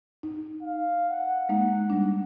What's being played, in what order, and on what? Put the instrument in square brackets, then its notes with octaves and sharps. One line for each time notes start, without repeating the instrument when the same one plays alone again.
[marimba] D#4
[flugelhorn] F5
F#5
[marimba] G#3 A#3 D#4
G3 D4